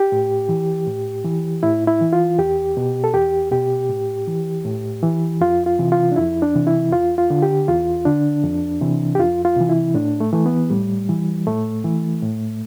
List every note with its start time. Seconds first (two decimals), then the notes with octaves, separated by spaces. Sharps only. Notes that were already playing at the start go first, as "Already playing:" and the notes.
Already playing: G4
0.12 A2
0.49 E3
0.87 A2
1.25 E3
1.63 A2 E4
1.87 E4
2.01 E3
2.13 F4
2.39 E2 G4
2.77 B2
3.04 A4
3.14 E2 G4
3.52 B2 G4
3.90 A2
4.27 E3
4.65 A2
5.03 E3
5.41 F2 F4
5.66 F4
5.79 C3 E3
5.92 F4
6.12 D4
6.16 F2 E4
6.42 D4
6.55 C3 E3
6.67 E4
6.92 E2 F4
7.18 F4
7.30 D3
7.42 G4
7.68 E2 F4
8.05 D3 D4
8.43 F2
8.81 C3 E3
9.15 G4
9.19 F2 F4
9.45 F4
9.56 C3 E3
9.69 E4
9.94 A2 D4
10.20 A3
10.33 E3 A3
10.46 B3
10.70 A2 G3
11.09 E3
11.47 A2 A3
11.84 E3
12.22 A2